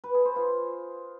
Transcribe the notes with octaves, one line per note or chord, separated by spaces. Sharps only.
B4
G#4
C5
F4